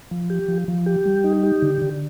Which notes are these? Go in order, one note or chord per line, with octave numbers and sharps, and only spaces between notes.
F3
G4
F3
F3
G4
G3
D#4
G4
D3
D3